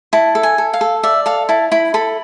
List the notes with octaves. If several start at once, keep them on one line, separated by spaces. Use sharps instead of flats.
E4 A5
A4
G#5
A4
F5
A4
D5 E5
A4 F5
E4 A5
E4 B5
A4 B5